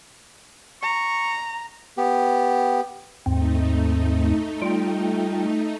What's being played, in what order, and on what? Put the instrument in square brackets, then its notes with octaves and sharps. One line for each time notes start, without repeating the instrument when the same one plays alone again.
[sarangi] A#5 [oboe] C#6
[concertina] B3 G4
[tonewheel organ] D#2 G#2 C4 [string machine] A3 D#4
[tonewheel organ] G3 F4 G5